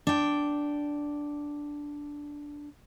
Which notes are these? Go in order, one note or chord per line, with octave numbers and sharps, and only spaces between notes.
D4 G5